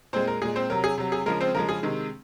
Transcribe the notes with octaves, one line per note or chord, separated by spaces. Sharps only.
A#2 G#3 C4 C5
A#4
A#2 G#3 G#4
C4 C5
C3 F#3 A#4
G#4
C3 F#3
G#4
C#3 F3 G#3 A#4
C4 C5
C#3 F3 G#3 A#4
G#4
C3 D#3 G#3